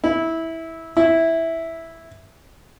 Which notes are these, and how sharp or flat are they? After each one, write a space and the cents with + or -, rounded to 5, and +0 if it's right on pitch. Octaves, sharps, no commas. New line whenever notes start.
E4 -15
E4 -5